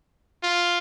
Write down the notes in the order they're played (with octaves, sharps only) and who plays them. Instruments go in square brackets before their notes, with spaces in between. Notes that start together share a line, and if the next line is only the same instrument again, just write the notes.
[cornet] F4